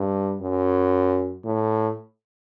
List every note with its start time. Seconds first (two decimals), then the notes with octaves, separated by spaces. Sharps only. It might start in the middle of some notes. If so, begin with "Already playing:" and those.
Already playing: G2
0.42 F#2
1.45 A2